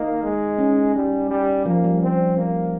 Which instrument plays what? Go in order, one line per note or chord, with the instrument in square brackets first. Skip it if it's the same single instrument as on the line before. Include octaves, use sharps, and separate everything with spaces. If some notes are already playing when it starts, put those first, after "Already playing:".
Already playing: [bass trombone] A#3 [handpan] D#4
[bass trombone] G#3
[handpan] C#4
[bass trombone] G3
G3
[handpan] F3 [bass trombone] A#3
[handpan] G3
[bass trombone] C4
A#3